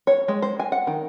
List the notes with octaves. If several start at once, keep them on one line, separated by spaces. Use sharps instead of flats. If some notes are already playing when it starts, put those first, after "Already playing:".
C#5
G#3
C5
G#5
F#5
D#3